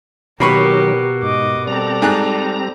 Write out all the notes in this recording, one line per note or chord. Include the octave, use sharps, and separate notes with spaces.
B2 D#3 F#3 A#3 G4 A#4 B5 C#6
G#2 D#5 D6
G3 C4 A4 D5 A#5
G#2 G#4 F#6